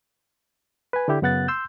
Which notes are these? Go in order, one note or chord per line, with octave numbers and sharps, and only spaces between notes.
B4 G#5
D3 D4 E4 G4
F#2 C#3 B3 F#5 F#6 A6
C6 E6 G6